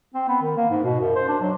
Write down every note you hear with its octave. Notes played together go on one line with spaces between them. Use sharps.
C4
B3
D#3
A#3
G#2
B2
F#2
C5
D4
F#3